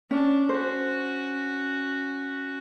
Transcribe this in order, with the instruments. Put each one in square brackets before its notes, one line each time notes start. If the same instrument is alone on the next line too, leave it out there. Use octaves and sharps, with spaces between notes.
[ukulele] C#4 [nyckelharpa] D4
[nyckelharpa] C#4 F#4 [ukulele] C5